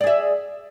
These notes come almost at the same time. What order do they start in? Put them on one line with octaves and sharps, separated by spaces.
D5 G#4 E5